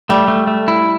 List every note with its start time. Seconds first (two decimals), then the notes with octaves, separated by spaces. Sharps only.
0.09 G3 A3
0.28 A3
0.47 A3
0.68 E4